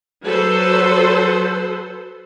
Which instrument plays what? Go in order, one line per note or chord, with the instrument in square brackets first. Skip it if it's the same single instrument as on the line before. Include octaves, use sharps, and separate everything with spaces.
[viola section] F#3 A4 B4 C5